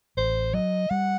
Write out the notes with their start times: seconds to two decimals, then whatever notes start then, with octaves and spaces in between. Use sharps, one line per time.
0.17 A1 C5
0.53 F#3 D#5
0.90 G3 F#5